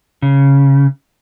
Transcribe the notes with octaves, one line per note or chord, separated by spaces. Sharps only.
C#3